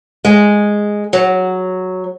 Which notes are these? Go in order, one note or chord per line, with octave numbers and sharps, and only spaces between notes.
G#3
F#3